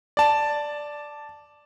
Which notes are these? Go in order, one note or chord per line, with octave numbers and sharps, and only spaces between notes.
D5 A5